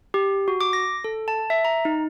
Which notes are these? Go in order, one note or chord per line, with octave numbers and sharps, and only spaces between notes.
G4
F#4
D6
A#6
A4
A5
E5
A#5
D#4